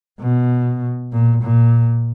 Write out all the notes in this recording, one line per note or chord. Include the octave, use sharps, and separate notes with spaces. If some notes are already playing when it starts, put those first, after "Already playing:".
B2
A#2
A#2